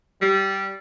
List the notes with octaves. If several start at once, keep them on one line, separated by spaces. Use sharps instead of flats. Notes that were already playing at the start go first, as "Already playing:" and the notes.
G3